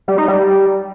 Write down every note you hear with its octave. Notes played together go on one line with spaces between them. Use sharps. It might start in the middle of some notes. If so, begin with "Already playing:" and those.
G3
D#4
G3